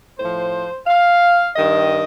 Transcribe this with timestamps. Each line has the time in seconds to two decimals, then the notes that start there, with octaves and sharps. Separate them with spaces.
0.18 A2 F3 C5
0.87 F5
1.56 G2 D#3 D#5